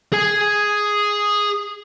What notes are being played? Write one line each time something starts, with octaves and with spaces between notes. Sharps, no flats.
G#4 G#5